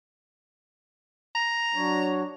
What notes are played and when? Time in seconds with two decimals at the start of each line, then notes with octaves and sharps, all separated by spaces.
1.35 A#5
1.75 F#3 D4 C#5